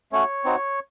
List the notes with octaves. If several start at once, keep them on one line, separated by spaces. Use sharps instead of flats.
A3 C#4 F#4 C#5
C4 D#4 F#4